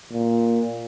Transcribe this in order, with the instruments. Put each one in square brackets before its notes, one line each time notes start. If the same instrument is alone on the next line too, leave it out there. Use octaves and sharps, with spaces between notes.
[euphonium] A#2